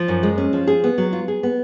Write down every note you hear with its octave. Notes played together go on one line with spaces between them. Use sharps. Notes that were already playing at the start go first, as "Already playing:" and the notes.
Already playing: F3
F#2
G#3
C#4
F3
G#4
B3
F#3
F4
G#4
B3